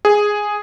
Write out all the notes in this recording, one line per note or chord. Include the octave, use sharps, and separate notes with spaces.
G#4